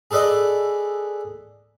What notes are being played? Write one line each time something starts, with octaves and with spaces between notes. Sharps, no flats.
G#4 A4 B4 D5 D#5